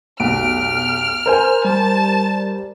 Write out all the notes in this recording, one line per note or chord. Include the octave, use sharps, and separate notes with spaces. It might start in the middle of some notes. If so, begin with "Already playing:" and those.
F1 B1 F6 D7
A#4 C5 G#5
G3 A5